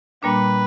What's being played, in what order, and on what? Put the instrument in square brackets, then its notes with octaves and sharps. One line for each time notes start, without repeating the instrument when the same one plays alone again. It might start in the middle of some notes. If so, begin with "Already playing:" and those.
[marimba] A#2 G3 A#3 D4 [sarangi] B4